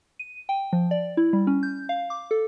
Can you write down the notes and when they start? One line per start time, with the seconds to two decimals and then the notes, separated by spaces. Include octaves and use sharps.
0.19 D#7
0.49 G5
0.73 F3
0.91 D5
1.17 E4
1.33 G3
1.47 C#4
1.63 G6
1.89 F5
2.10 D6
2.31 A4